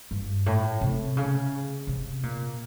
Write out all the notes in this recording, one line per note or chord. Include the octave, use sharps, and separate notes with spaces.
G2
A2
C3
C#3
C3
A#2